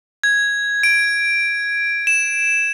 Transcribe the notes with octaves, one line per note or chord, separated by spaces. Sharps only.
G#6
D7
E7